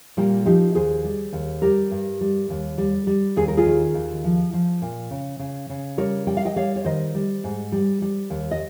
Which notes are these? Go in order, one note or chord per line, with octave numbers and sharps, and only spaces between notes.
A#2 G3 A#3
F3 D#4 G4
D#2 G#4 C5
G3
D#2
G3 G4 A#4
G2
G3
D#2
G3
G3
D#2 G#4
A#4
F4 G#4
D#3
D#2
F3
F3
A#2
C#3
C#3
C#3
G3 A#4 C#5
G3 G5
F5
D#5 G5
G3 C#5 F5
C#5
D#3 C5 D#5
G3
G#2
G3
G3
D#2
D#5